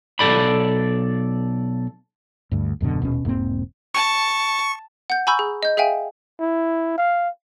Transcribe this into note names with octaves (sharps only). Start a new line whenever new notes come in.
B1 G#2 A4 D5 B5
D2 G2
D#1 F#2 B2 D3
D#1 B2 C#4
E1 G#2 A#3 C4
A5 C#6
F#5 G6
G#5 A#5 B5 C#6 E6 G6
G#4
D#5 G6
G#4 E5 F5 G5 G#5
E4
F5